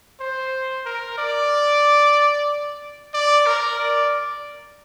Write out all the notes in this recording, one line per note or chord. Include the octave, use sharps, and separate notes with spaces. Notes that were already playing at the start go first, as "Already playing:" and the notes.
C5
A#4
D5
D5
A#4
D5